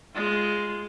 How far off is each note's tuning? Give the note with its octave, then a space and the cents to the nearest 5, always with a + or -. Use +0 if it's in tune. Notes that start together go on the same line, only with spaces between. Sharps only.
G#3 +0 F4 +0